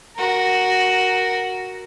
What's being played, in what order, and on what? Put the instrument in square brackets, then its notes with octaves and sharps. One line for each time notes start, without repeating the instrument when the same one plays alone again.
[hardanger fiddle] F#4 A#4